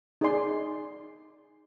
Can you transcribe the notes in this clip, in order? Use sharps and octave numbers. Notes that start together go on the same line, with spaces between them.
D#4 G#4 D5 G#5 C6